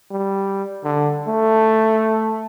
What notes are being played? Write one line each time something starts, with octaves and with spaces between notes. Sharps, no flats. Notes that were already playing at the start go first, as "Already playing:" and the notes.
G3
D3
A3